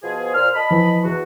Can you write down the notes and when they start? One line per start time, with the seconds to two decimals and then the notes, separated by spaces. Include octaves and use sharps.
0.02 B2 F3 G#4
0.34 A#2 C5 F6
0.55 D#5 A5 B5
0.71 E3 F3
1.03 E2 F#4